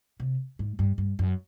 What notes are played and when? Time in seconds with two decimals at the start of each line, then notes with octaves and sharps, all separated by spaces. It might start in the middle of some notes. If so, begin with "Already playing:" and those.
0.20 C3
0.59 G#2
0.79 G2
0.98 G2
1.19 F#2